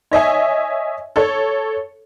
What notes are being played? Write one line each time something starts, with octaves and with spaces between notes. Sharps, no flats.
C#5 D#5 E5 G#5
A4 C#5